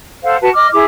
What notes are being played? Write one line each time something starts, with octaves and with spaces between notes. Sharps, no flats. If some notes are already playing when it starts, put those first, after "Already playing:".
A4 C5 F5 F#5
F#4 B4 A5
D#5 D6 F6
E4 G#4 D6